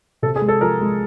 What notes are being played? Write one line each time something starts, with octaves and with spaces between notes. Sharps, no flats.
C3 A4
G#4
G#3
A4
F3 A#4
G#3